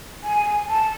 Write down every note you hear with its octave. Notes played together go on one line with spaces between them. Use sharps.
G#5
A5